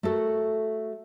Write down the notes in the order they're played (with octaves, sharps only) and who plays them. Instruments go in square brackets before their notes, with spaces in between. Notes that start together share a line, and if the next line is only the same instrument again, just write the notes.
[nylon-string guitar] A3 F#4 A4 A#4